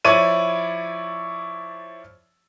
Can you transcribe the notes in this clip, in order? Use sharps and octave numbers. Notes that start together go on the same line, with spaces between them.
F3 E4 C#5 D5 D#7